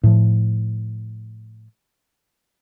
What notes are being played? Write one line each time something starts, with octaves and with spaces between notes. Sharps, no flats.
A2 F3